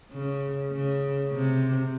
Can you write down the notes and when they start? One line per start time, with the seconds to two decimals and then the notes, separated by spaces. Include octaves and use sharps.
0.11 C#3
0.71 C#3
1.32 C3